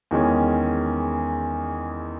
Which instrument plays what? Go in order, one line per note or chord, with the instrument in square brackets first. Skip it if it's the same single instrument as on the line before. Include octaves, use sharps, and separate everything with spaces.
[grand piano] E2 D#3 G#3 C#4